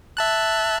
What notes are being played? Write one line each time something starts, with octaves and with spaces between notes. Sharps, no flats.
E5 A5 F#6